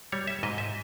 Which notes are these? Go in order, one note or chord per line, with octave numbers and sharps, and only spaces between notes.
G3 C#5
E5
G#2 D#5
E5